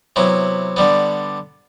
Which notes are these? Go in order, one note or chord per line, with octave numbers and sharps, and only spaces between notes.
C3 F#3 B3 E4
D3 G3 B3